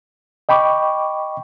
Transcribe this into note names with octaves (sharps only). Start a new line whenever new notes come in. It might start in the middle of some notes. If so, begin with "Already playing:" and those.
D#5 G5 B5 C#6 D6